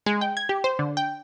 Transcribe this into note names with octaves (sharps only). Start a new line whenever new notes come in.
G#3
G5
G#6
G4
C5
D3
G5